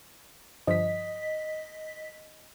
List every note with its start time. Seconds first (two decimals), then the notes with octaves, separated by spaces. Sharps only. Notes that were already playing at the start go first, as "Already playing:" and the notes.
0.67 G2 D3 F3 D#5 B6